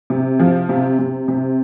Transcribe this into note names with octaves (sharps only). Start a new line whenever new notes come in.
C3
F3
C3
C3
C3